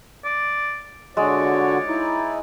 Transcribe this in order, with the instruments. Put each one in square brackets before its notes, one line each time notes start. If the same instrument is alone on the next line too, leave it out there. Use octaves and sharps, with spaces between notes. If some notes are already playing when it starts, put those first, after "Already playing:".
[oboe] D5
[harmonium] D3 F#4 [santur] G#3 [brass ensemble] F4 C#5 [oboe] D5
[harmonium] D#4 E4